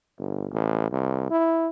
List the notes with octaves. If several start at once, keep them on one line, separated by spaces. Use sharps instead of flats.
G1
A1
C2
E4